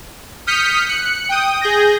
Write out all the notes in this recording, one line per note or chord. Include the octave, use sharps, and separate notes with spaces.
D#6 F6 G6 B6 C#7
F#6 C#7
G5 D#6
G#4 G6 A#6